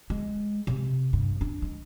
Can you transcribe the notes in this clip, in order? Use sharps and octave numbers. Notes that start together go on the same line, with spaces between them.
G#3
C3
G2
D4
G#3